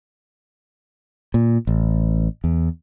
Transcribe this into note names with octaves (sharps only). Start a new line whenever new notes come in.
A#2
A1
E2